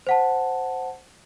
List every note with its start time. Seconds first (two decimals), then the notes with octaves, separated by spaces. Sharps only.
0.07 C5 F#5 A5